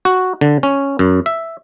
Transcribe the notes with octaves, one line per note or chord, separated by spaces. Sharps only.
F#4
D3
C#4
F#2
E5